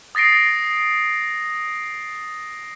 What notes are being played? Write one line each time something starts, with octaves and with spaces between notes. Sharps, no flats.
D#6 A6 A#6 C7 D7